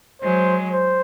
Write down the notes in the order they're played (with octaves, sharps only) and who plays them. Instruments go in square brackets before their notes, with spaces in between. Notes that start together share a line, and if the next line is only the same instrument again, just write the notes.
[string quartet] F#3 G#3 [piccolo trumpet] C5
[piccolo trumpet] C5